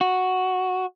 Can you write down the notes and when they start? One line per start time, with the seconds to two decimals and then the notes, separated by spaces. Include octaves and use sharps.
0.01 F#4